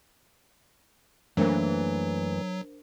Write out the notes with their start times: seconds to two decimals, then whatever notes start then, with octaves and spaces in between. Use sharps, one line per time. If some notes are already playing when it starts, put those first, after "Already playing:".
1.37 F#2 E3 F#3 A3 A#3 D4 A#4 C5